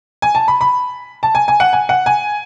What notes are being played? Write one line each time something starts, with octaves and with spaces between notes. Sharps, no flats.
G#5
A5
B5
B5
A5
G#5
G#5
F#5
G#5
F#5
G#5